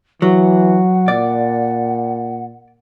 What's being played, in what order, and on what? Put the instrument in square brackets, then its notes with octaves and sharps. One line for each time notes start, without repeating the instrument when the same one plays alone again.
[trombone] E3 [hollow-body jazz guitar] F#3 [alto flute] F#5
[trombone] A#2 [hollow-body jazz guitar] D5